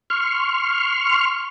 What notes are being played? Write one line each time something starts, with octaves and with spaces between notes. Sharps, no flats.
C6 C#6 F6